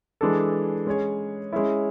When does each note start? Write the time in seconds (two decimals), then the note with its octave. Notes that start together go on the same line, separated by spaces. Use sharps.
0.21 E3 G#3 D4 A4
0.87 G#3 C#4 G#4 C#5
1.52 G#3 C#4 E4